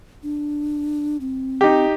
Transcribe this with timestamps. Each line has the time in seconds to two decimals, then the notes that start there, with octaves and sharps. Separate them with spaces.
0.23 D4
1.21 C4
1.61 D#4 G4